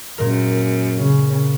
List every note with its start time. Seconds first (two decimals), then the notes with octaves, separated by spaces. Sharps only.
0.18 F#2 A#2 G#3 A#4
0.99 C#3